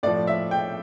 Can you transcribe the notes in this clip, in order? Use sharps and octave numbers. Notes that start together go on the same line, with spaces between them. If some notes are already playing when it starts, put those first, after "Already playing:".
A2 F3 D5
E5
G5